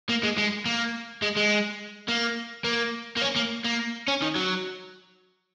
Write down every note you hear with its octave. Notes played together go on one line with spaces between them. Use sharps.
A#3
G#3
G#3
A#3
G#3
G#3
A#3
A#3
A#3
C#4
A#3
A#3
C#4
D#3
F#3